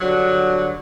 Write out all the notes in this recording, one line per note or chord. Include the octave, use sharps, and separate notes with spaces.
G2 D3 F#3